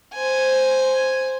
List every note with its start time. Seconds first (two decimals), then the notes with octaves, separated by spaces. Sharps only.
0.15 C5 G#5